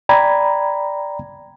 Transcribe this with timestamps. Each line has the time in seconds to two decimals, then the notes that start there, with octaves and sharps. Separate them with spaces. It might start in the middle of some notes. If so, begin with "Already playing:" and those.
0.09 D5 G5 A#5 B5 G#6